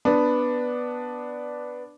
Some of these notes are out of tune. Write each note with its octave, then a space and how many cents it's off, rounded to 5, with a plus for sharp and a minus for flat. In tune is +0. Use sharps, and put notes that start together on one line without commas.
B3 +0 D4 +0